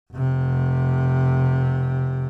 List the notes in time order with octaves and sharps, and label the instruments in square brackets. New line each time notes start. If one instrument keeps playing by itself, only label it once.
[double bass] F1 C3